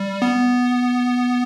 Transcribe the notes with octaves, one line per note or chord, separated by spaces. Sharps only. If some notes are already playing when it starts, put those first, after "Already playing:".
Already playing: G3
B3